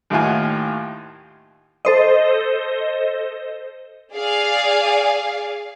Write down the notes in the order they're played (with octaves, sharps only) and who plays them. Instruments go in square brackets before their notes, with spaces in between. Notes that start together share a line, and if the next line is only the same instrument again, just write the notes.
[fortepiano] D#2 A2 D#3 F4 F#5 G#5
[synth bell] A4 C5 D#5
[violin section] G#4 D5 F5